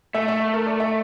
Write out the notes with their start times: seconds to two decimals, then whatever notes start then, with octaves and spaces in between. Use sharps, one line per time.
0.14 A3 E5
0.28 E5
0.54 A#4
0.67 D5
0.80 E5